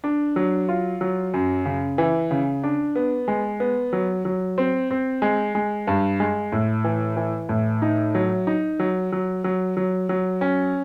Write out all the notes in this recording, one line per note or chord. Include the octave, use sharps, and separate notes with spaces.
D4
F#3
F4
F#3
F#2
C#3
E3
C#3
D4
B3
G#3
B3
F#3
F#3
C4
C4
G#3
G#3
G2
G#3
A2
E3
E3
A2
D#4
F#3
D#4
F#3
F#3
F#3
F#3
F#3
C#4